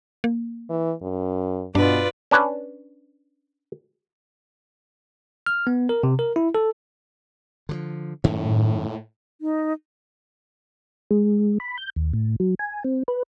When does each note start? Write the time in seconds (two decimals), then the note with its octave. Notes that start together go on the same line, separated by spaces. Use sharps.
0.24 A#3
0.70 E3
1.02 F#2
1.75 G2 B2 D4 F4 B4 D5
2.31 C#4 D4 B4 C#5
5.46 F6
5.67 B3
5.89 A#4
6.03 C3
6.19 A#4
6.36 E4
6.55 A4
7.69 D3 D#3 F3
8.24 F#2 A2 D#3 C#4
9.41 D#4
11.11 G#3
11.60 B5
11.78 G6
11.96 D#2
12.13 A2
12.40 F#3
12.59 G#5
12.84 C4
13.08 B4